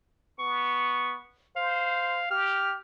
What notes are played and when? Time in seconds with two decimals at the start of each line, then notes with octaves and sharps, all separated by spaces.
0.39 B3 C#6
1.56 C5 F5
2.31 G4 F6